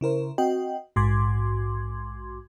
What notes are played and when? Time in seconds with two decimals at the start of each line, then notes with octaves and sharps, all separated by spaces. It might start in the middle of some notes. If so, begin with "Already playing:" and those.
0.01 C#3 E4 A#4 C5
0.38 C4 F#4 D#5 G5
0.96 A#1 G#2 F#4 C6 D6 G#6